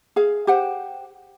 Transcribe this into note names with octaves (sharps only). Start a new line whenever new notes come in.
G#4 F5
G4 C5 F#5 G5